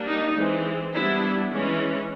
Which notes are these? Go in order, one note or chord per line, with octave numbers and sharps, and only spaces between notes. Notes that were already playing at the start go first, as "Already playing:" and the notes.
Already playing: G3 A#3 D4
D#4
E3 G#3 C4
G3 B3 D4 E4
E3 G#3 C#4